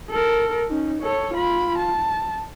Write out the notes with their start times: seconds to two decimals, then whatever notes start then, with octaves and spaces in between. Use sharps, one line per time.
0.10 A4 A#4
0.68 C#4 D#4
1.02 A4 C#5
1.34 F4 B5
1.78 A5